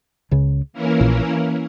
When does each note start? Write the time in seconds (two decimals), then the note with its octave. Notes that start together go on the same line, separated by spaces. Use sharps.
0.31 C#2 C#3
0.73 E3 A#3 C#4 E4 A#4
1.01 A#1 A#2